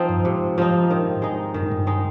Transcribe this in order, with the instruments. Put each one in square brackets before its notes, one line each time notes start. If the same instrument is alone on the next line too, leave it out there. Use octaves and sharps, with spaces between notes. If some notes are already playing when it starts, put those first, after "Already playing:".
Already playing: [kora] F3 C4 D#4
[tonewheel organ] G2
[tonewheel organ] G#2 [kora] C3
[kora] F3 C4 D#4
D#3
G#3 D#4
[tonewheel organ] G2 [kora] D#3
[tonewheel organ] G#2
G2
[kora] G#3 D#4